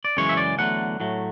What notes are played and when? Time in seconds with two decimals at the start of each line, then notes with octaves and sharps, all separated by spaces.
0.05 D5
0.17 F#2 C#3 E3 G#3 C#5
0.29 E5
0.37 D5
0.58 E2 D3 F#3 A3 F#5
1.00 A2 F#3 A3